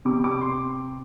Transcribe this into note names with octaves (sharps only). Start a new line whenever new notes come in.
C3 D6
D6
C6